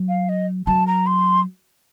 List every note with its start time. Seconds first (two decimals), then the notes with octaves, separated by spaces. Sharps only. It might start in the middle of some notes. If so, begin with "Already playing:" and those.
Already playing: F#3
0.08 F5
0.29 D#5
0.67 F#3 A5
0.87 A#5
1.07 C6